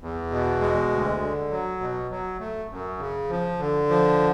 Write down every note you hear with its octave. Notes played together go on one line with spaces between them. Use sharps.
E2
B2
G#3
D2
D3
F#3
B2
F#3
A3
F#2
C#3
F3
D3
F3